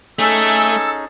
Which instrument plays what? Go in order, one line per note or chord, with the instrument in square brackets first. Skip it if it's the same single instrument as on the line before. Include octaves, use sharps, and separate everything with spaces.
[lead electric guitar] A3 [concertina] C#4 D#4 G#4 [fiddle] A4 [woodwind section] E6